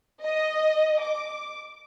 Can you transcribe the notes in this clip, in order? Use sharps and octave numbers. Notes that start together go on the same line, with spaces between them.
D#5
D6